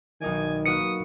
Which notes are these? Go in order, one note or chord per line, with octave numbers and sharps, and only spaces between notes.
B1 D#3 D#4 D5 G#5
A#3 F#4 B4 D#6 C#7